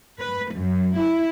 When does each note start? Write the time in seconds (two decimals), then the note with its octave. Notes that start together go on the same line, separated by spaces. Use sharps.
0.20 B4
0.53 F#2
0.97 E4